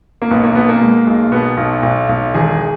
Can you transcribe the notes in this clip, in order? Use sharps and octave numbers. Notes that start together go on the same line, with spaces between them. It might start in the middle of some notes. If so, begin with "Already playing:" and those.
A#3
B1 B3
A#3
B2 B3
A#3
G#3
B1
B2 B3
B1
B1
B1
E1 G#4